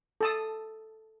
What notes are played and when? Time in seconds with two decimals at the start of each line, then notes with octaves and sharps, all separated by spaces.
0.21 A4 A5 D#6